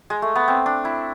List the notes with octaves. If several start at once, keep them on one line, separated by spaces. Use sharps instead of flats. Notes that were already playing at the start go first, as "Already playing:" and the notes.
G#3
A3
B3
C4
D4
E4